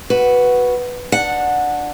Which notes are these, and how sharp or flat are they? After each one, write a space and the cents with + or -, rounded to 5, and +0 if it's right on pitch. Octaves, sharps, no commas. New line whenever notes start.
F#4 +0 B4 +0
D4 +10 F#5 -15